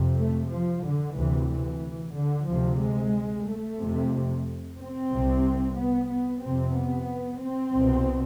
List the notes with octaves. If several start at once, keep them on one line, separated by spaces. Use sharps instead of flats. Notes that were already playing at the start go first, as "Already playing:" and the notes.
Already playing: F2 C3
A3
F3
D3
D2 C3 E3
E3
D3
D2 C3 F3
G#3
A3
F2 C3
C4
C2 C3
B3
B3
F2 C3 C4
B3
C4
C2 B2